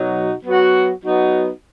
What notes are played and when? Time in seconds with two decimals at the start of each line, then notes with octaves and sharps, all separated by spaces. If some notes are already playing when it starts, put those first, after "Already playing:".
Already playing: B2 F#3 D#4 F#4
0.43 F#3 B3 F#4
1.02 F#3 B3 D#4 F#4